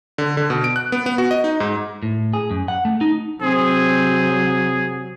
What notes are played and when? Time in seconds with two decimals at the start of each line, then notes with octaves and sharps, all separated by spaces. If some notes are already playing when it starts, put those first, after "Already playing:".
0.18 D3
0.37 D3
0.50 B2
0.64 D7
0.76 F#6
0.92 B3
1.06 B3
1.18 F#4
1.31 D#5
1.44 D#4
1.60 G#2
2.03 A2
2.33 G#4
2.51 F#2
2.68 F#5
2.85 A3
3.01 D#4
3.41 C3 F#3 C4 G#4 C5